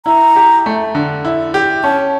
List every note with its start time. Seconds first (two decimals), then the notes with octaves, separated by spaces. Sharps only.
0.06 E4 A#5
0.36 G4
0.66 A3
0.95 D3
1.25 E4
1.54 G4
1.84 C#4 A5